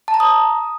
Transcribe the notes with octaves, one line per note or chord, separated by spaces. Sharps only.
A5
A#5
D#6